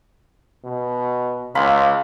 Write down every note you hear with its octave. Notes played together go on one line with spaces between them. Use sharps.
B2
C#2 F5 B5 C6